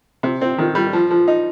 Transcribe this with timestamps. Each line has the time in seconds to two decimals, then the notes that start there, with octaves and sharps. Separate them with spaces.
0.23 C3
0.41 C4
0.58 D#3
0.75 G3
0.93 F3
1.10 F3
1.28 D#4